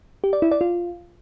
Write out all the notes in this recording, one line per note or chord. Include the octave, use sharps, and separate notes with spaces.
G4
D5
E4
D5
F4